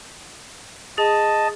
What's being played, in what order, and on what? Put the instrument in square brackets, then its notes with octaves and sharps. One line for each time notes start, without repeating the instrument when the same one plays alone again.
[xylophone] G#4 [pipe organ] D#5 A5